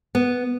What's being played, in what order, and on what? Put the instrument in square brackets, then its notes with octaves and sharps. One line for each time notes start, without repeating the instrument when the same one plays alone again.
[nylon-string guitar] B3